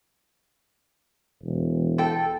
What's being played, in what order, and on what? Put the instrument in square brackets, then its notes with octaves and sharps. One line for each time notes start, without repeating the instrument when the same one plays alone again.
[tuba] E1
[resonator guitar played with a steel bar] A4 G5